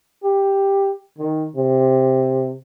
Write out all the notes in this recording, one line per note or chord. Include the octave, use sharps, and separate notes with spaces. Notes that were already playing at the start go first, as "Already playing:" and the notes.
G4
D#3
C3